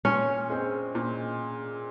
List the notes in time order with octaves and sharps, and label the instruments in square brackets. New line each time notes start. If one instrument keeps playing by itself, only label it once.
[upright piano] A#2 [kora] C#4
[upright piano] G#3 C4
A#2